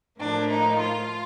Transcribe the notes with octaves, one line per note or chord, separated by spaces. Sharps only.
A2 F3 A#3 D4
D#4
F4